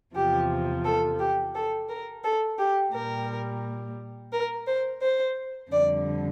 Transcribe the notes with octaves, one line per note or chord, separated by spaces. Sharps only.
E2 C3 F3 G4
A4
G4
A4
A#4
A4
G4
A#2 G3 A#4
A#4
C5
C5
F2 D3 G3 D5